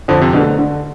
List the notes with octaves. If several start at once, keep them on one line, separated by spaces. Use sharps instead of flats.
F2 D3
C3
B2 D3 A3
D3